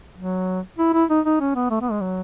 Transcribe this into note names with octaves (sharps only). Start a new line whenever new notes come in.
F#3
E4
E4
D#4
D#4
C#4
B3
A3
B3
G#3
F#3